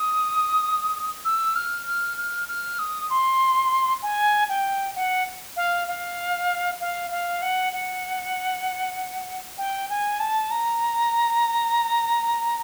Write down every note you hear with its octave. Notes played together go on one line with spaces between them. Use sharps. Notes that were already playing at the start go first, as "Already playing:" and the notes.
Already playing: D#6
E6
F6
F6
F6
F6
D#6
C6
G#5
G5
F#5
F5
F5
F5
F5
F#5
F#5
G5
G#5
A5
A#5